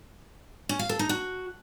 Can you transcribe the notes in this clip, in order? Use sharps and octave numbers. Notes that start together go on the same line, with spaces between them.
C#4
F5
A4
D#4
F#4